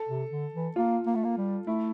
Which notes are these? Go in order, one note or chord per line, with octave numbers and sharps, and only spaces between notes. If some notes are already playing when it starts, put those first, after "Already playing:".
Already playing: A4
C3
D3
E3
A#3 F4
A#3
A3
A#3
G3
A3 E4